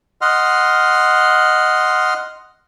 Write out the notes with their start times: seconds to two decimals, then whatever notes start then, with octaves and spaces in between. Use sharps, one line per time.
0.21 D#5 F#5 C6 F6